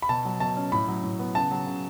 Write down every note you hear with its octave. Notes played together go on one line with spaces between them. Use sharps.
B5
B2 A5
F#3
B2 A5
C#4
A2 B5
F#3
A2
B3
C#3 A5
F#3
C#3